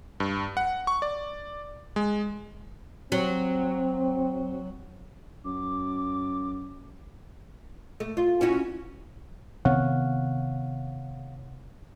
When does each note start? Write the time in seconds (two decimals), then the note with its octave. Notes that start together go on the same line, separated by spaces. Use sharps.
0.20 G2
0.57 F#5
0.87 C#6
1.02 D5
1.96 G#3
3.12 F#3 C4
5.45 F#2 D6
8.00 A3
8.17 F4
8.41 C#4 E4 F#4
9.65 C3 D#3 B3 C#5 F5 F#5